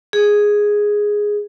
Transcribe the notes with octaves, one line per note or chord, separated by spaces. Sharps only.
G#4